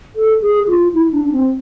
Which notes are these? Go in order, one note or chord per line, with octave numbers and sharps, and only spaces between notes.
A4
G#4
F4
E4
D4
D4
C4